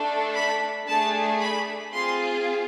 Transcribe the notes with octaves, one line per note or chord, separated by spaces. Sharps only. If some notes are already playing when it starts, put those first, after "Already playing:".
Already playing: A3 D4 A4
B5
A3 D4 G#4 A5
B5
C4 F4 G#4 C6